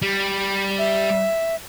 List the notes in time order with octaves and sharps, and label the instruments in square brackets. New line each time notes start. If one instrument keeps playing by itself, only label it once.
[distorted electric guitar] G3
[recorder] E5